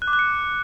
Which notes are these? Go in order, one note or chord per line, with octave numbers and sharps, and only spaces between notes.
F#6
D6
F#6
C#7